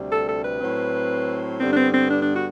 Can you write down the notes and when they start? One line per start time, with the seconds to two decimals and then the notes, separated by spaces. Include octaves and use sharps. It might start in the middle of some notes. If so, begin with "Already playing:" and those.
Already playing: D2 C3 G3
0.11 A4
0.28 A4
0.44 B4
0.61 A2 F#3 C4
1.60 G2 D3 G3 B3 C4
1.73 D4
1.77 C4
1.94 C4
2.10 D4
2.23 D4
2.35 F#4